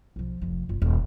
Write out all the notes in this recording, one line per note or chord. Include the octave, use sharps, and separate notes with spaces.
B1 F3
F1 F3
F#1 F4
D#1 F2